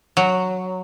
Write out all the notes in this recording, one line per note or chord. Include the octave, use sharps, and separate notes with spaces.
F#3